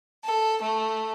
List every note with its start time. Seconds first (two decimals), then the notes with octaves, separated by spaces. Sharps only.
0.24 A4
0.62 A3